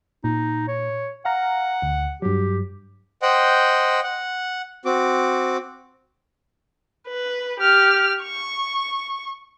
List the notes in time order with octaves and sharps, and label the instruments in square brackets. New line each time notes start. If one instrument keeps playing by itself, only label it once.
[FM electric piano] A#2 [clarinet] D#4
[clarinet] C#5
[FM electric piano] F5 A#5 [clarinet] F#5
[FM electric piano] D2
[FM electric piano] G2 F#3 [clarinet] G4
[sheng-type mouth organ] C5 D#5 F#5 G5
F#5
C4 F#4 D6
[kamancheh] B4
G4 F6
C#6